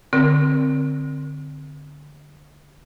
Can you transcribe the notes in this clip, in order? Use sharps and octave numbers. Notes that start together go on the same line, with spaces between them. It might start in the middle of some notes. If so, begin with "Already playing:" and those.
D3 C4 A#4